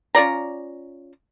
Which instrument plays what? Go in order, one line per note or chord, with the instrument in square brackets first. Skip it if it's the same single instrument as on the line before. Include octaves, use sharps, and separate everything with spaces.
[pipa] C#4 F4 D5 A#5